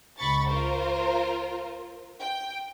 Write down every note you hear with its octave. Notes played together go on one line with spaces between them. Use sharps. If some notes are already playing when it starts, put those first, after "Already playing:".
C#2 B5 C#6 A6
F4 A#4 C5
G5